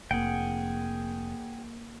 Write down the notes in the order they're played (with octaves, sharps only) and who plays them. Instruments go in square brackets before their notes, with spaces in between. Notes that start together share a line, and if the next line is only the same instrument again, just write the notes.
[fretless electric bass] F1 [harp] A#3 [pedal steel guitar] G#4 F#5 G5